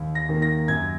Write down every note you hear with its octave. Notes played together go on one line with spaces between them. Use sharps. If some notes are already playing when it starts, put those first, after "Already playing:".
Already playing: D#2
A#6
D#3 A#3
A#6
F#2 G#6